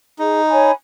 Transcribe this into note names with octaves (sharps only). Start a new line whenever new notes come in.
D#4 G#4
C#5 G#5 B5